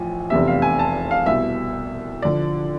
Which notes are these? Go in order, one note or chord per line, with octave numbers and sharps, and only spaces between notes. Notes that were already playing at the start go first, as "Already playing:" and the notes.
Already playing: A1 A2 F3 G#5
F1 E2 C3 E5
F5
G#5
A5
F5
C2 B2 E5
D3 F3 D5